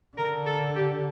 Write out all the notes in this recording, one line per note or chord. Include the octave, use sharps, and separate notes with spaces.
D3 A#4
A4
G4